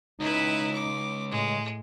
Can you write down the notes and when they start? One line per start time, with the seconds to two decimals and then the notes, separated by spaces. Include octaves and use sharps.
0.20 C#2 D#4 E4 B4
0.73 D6
1.30 A2 G#3